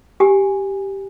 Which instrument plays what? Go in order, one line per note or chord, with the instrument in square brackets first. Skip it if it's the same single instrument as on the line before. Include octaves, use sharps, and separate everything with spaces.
[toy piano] G4 G#5